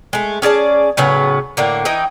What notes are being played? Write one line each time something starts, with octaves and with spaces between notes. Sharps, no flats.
G#3 A3
C#4 G#4 D5 A5
A2 C#3 F#3 B3
A2 D3 A#3
E3 D#4 D#5 G5